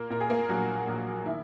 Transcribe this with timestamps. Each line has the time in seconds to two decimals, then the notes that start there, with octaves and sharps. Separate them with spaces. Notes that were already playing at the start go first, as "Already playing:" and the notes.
Already playing: A#2 A#3 A#4
0.10 A#2 A#4
0.20 G#4
0.30 A#3 A#4
0.49 A#1 F#3 F#4
0.88 A#1
1.26 D#3 E4